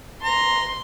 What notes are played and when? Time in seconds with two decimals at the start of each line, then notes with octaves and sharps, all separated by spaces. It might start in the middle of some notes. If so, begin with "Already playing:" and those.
0.23 A#5 C6